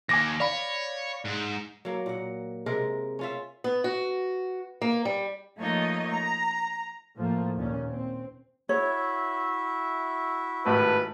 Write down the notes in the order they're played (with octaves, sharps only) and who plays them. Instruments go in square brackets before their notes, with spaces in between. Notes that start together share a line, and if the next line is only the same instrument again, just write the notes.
[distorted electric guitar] D#2 [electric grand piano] G#5 D6 A#6
[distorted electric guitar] C#5 [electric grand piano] D5 F5 B5
[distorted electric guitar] G#2
[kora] F#3 A#3
A#2 F#5
C3 G#3 A#4
C#4 F4 E5
[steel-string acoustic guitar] B3
F#4
A#3
G3
[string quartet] F3 A3 A#3 D#4 C#5 D#5
A#5
[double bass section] A2 F3 A3 A#3
D#2 A#2 C#4
C4
[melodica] E4 F#4 E5 [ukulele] C#5
[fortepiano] G#1 A2 G4 [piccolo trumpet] B4